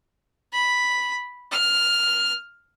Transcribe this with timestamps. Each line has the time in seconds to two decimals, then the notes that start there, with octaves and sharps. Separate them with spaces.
0.52 B5
1.51 F6